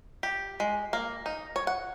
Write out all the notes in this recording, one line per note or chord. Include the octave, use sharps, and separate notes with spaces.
G4
G#3
A#3
D#4
C#5
F#5